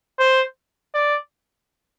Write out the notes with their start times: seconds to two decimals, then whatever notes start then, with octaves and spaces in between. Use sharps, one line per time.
0.19 C5
0.94 D5